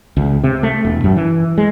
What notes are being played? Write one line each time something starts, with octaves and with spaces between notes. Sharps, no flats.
C#2
C3
A3
E1
F#2
E3
G#3